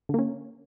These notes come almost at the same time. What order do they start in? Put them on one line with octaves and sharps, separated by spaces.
D3 A#3 C#4